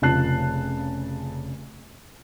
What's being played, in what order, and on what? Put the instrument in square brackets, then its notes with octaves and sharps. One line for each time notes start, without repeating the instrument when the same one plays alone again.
[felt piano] F1 C#3 F4 A5 F#6 C7